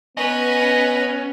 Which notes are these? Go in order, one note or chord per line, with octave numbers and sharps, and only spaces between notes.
B3 C#4 B4 D#5